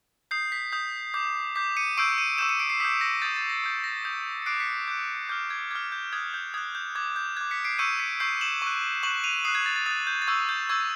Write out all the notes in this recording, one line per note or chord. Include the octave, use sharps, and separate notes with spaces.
D#6 G6 C7
B6
D#6 G6
D6 G6
D6 G6 B6
C#7 D#7
C#6 E6 G6 C7 D7
C#7 D#7
C#6 E6 G6 D7 E7
C#7 D#7
C7 D7
C7
D#6 G6 B6
A#6
D#6 G6 A6
A6
A#6
D#6 G6
A#6
D#6 G6
C#7
D6 F#6 C7 D7
B6 C#7
D6 F#6 G6
D6 F6 G6
G#6
D6 F6 G#6
G6
D#6 F#6 G#6
G6
D#6 F#6 G#6
G6
D6 F#6 G#6
G6
D6 F#6 G#6
B6 C#7
C7 D7
C#6 E6 G6 C#7 D#7
B6 C#7
C#6 E6 G6 C7
E7 F#7
C#6 F#6
C#6 F#6 E7 F#7
D#7 F7
D#6 F#6 C7
G#6
A6
A6
D#6 F#6 A6
G6
A6
C#6 E6 G6 G#6
G6
C#6 E6 G6 G#6